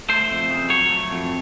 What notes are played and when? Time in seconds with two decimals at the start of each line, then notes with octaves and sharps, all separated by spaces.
0.09 A3 C5
0.30 F2
0.50 C#3
0.70 F#3 C#5
0.90 A3
1.12 F2